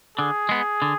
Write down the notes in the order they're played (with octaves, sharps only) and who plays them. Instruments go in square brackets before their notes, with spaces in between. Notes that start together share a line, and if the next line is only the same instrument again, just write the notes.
[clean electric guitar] D3 [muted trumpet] G#4
[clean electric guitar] G#3 B3
D3